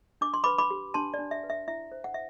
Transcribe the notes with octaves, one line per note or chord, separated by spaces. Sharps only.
D4 D6
C6
B4 B5 D6
B5 D6
G4
D4 A5 C6
D5
D4
E5
B4
E5
E4 E5
C5
F#5
E5